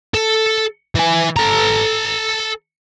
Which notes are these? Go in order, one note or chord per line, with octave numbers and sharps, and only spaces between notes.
A4
E3 G#5
A4 A#5